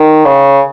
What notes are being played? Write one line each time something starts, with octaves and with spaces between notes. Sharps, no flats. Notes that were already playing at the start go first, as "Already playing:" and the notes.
Already playing: D#3
C#3